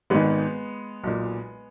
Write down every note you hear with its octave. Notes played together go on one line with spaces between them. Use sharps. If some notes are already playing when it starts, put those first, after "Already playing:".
G#1 G#2 D#3 G#3 B3
B1 A#2